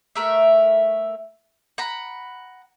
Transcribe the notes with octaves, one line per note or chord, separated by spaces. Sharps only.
A3 A#4 E5
F#5 A#5 B5